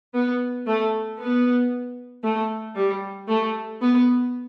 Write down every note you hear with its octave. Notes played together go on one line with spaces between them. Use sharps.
B3
A3
B3
A3
G3
A3
B3